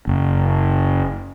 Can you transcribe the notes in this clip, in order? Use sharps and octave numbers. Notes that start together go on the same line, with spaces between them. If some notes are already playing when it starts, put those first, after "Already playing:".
F#1